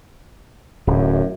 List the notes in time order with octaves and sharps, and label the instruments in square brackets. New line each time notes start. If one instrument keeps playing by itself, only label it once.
[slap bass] D1 [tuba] F#2